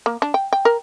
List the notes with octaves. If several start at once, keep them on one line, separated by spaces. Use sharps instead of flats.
A#3
D4
G5
G5
A#4